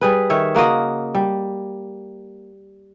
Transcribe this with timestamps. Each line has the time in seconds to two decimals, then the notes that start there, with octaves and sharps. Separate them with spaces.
0.01 G3 G#4 B4
0.30 D#3 C#5 E5
0.55 C#3 A#3 F#4 D#5
1.15 G3